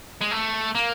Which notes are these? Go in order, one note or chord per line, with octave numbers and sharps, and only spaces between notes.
G#3
A3
A#3